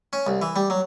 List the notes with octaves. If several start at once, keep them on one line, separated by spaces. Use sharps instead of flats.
C#4
C2
E3
G3
F#3